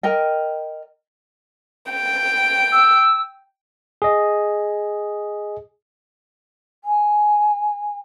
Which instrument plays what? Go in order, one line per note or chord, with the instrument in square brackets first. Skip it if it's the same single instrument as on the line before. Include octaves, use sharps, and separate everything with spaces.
[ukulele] A#4 D#5 G5
[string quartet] G5
[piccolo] E6
[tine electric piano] G#4 D#5
[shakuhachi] G#5